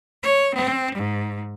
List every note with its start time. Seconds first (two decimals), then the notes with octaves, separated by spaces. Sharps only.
0.23 C#5
0.55 C4
0.94 G#2